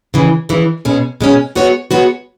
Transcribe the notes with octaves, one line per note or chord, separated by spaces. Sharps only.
C#3 E3 G#3
C#3 E3 G#3
B2 G#3 C#4
B2 G#3 C#4
G#3 B3 F#4 C#5
G#3 B3 F#4 C#5